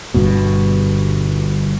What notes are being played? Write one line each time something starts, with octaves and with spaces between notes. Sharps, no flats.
G1 G2 B2